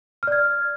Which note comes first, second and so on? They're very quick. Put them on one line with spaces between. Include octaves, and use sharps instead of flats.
F6 D5 G#6